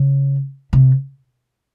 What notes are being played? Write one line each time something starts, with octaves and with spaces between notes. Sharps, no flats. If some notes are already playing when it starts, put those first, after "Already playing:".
Already playing: C#3
C3